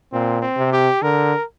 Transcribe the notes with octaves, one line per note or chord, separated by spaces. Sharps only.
A#2 C4
C4
C3
G4
D3 A#4